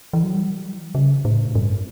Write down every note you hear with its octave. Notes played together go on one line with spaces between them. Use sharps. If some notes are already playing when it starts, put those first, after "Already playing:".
E3
F#3
G3
C#3
A2
G2